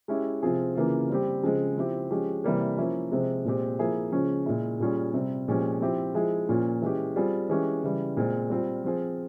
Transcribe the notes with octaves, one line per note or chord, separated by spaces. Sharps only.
G#3 C#4 E4 G4
C3 F3 C4 F4 G#4
C#3 E3 A#3 F4
G3 C4 G4
C#3 F3 G#3 C4
F3 C4 E4 G4
F3 G#3 C#4 G4
C3 E3 G3 A#3
F3 A#3 C#4 E4
C3 F3 G#3 C4
A#2 G#3 C4 G4
F3 A#3 E4 G#4
C#3 F3 G#3 C#4
A#2 G#3 E4
A#2 G3 C#4 F4 G#4
C3 G3 C4
A#2 F3 G#3 C#4 G4
F3 C4 E4 G4
F3 G#3 E4 G#4
A#2 F3 A#3 C#4 F4
E3 G#3 C#4 G4
G3 C4 F4 G#4
E3 G#3 C#4 G4
C#3 E3 G3
A#2 G#3 C4 F4
G3 C4 F4
F3 C4 F4 G#4